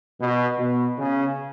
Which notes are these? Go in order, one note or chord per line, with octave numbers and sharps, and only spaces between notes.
B2
B2
C#3